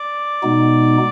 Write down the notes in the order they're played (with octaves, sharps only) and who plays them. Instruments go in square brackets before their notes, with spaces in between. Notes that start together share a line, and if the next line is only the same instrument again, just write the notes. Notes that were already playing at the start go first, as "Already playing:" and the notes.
Already playing: [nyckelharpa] D5
[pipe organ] B2 G#3 B3 D#4